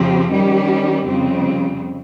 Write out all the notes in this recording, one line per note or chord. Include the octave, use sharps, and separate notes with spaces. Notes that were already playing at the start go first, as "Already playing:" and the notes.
Already playing: F2 C#3 F3 C4 G4
D#3 G3 C#4 G4
F2 C#3 G3 C4